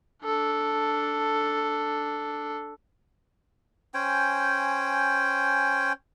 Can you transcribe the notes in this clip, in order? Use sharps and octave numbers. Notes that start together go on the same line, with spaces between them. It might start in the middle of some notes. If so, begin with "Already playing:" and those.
D4 A4
C#4 C5 G5 G#5